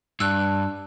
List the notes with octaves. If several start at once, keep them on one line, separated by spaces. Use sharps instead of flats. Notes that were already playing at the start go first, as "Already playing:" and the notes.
G2 D4 E6 F#6